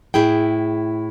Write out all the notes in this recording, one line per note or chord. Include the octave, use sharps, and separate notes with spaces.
A2 E4 G#4 G5